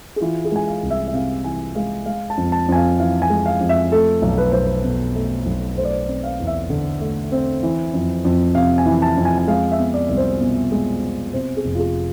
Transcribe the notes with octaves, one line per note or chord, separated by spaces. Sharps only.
G#4
E3 F4
G#4
G#3 G#5
F5
C2
E5
E5
C3 F5
E3 G#5
G#3 F5
G#3 F5
A5
F2
A5
F2 G#5
F5
E3 F5
G#5
G#3
F5
F2
E5
A3 A4
B1
B4
B1 C5
B4
B2
A3
B1
A3 C5
D5
C5
D5
C4
F5
E2
E5
D3
A3
C4
E3
F2
F2
C3 F5
G#5
E3
A5
F2
G#5
G#5
G#3 F5
E5
B3
D5
C2 D5
C5
B2
G#3
B3
C3 C5
G#4
F1
F4
G#4